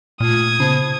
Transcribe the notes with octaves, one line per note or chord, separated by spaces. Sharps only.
A#2 A3 F4 D#6 G#6
C#3 B3 C5 A5